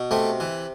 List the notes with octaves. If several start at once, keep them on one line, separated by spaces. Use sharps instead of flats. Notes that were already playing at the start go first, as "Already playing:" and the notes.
Already playing: B2
C3 A3
E3